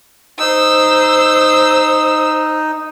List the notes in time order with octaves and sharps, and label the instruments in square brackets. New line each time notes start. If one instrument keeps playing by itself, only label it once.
[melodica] D#4 [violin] C5 E6